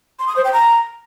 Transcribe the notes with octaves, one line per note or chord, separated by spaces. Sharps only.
C6
D#6
C5
G5
A#5